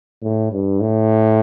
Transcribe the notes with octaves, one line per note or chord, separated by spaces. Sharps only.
A2
G2
A2